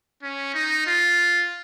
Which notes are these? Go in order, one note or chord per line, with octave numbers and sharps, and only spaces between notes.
C#4
D#4
F4